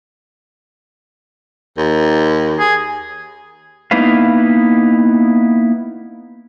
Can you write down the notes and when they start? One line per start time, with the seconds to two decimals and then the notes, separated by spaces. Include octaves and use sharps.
1.77 D#2
2.59 G#4
3.91 A#3 B3 D#4 E4 B4 F5